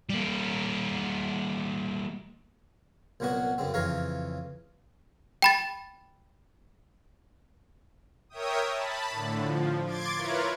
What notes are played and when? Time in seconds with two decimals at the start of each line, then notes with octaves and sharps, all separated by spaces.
0.09 G3 A#3
3.20 C2 A#2 F#3 B3 F#4
3.58 F#2 C#3 C4
3.74 F2 C#3 E3 C#5 F5 A#5
5.42 G5 B5 A6
8.30 A#4 C#5 E5 G5 D#6
8.72 A5 B5
9.10 A2 D3
9.40 F3
9.86 C6 D6 G#6 A6 D7
10.17 E4 F4 A#4 B4 C#5